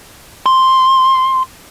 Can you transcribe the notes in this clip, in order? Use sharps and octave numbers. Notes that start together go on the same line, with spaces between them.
C6